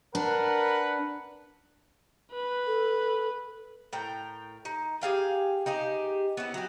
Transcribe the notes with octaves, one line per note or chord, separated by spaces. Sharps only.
D4 A#4 B4 F#5
B4
A4
A2 A#4 G5
D#4
G4 G#4 F5 G5
D#4 G4 G#4
B3 C#4 E4
F#3 G4